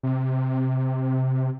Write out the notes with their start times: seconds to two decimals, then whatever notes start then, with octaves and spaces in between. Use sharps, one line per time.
0.03 C3